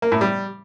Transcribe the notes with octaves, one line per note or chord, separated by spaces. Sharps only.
A#3
A2
G3